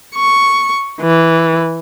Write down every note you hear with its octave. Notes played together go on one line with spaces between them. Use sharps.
C#6
E3